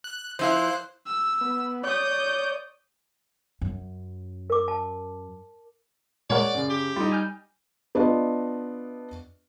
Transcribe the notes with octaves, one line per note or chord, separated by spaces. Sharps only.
F#6
F3 E4 C5 F5 F#6
E6
B3
C#5 D5 D#6 G6
F#2
A#4 D6
A5
A#2 G#3 A#4 C#5 D5 F#5
F#2 C#3
G4
G3 D#4 F4
G#5 F6 G6
B3 D4 F4 B4 D#5